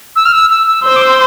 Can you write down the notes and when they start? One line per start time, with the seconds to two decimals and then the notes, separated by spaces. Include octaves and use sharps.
0.16 E6
0.25 F6
0.33 E6
0.50 E6
0.68 E6
0.84 C5 E6
0.96 D6
1.02 E6